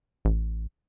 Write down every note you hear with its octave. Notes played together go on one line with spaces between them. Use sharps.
A1